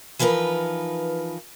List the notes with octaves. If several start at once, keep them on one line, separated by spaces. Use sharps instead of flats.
E3 F3 D#4 A#4 B4